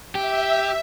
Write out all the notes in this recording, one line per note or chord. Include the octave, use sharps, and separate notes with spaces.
G4 E5